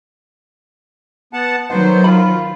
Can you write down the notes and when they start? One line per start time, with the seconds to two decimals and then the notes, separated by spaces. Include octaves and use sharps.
1.33 B3 F#5 A5
1.70 D#3 F#3 B3 C5 F#5
2.04 F4 B5